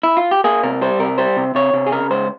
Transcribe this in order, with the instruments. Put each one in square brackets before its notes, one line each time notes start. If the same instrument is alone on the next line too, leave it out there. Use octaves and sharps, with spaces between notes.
[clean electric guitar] E4
F4
G4
A#3 G#4
C3 A#4
G3 C5
C3 A#4
G3 C5
C3
C3 C#5
C3
G#4
C#3 A#4
C#2 C5